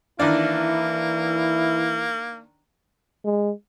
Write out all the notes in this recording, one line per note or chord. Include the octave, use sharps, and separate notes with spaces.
D#3 E3 A#3 D4 E4
G#3